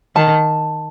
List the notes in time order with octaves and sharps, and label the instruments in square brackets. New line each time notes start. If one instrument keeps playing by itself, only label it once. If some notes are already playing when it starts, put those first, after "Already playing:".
[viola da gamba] D#3 [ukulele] A5